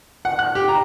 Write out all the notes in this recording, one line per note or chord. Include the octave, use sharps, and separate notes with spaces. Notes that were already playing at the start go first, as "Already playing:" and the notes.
F#5
F#6
G4
A#5